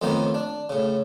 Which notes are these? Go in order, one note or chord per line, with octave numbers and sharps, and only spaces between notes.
F2 A2 D#3 A#3 B3 D#4
D4
A2 C#3